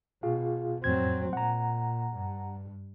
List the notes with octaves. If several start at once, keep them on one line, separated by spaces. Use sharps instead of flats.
B2 F4 G#4 F5
F2 A2 F#3 C4 G#6
A#2 F#5 A#5
G2